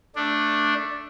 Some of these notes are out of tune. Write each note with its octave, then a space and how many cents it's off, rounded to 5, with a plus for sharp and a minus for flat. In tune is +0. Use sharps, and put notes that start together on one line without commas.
A3 +0 D4 +0